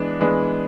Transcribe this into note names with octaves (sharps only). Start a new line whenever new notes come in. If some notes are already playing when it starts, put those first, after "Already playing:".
Already playing: E3 G#3 B3 D4
E3 G#3 B3 D4